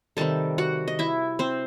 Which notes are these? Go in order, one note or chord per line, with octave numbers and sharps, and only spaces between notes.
C3 D#3 G3 A4 A5
F#4 F#5
D#5
E4 E5
C4 C5